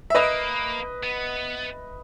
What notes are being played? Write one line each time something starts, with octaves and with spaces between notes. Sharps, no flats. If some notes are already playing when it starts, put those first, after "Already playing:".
E5
A#3 B4 D#5
B3